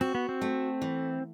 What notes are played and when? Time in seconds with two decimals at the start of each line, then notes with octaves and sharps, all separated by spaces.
0.01 C4 F#4
0.15 B3
0.29 C4
0.41 A3
0.82 E3